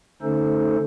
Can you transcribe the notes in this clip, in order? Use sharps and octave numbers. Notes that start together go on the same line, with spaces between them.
D3 A3 C#4 D#4 A4 C5